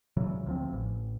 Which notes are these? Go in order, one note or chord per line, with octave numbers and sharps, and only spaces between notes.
A#2 C#3 E3 F#3
D2 F3 C4
A1